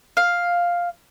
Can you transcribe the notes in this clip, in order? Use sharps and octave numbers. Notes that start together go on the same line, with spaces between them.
F5